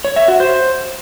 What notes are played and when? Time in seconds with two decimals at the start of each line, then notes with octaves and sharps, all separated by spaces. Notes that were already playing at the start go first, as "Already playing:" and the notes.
0.05 C#5
0.16 E5
0.28 F#4
0.40 C5